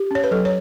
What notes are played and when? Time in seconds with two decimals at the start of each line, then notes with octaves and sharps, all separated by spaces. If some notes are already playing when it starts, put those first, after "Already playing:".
Already playing: G4
0.11 C#4 C#5
0.24 B4
0.31 F#3 A4
0.45 C#5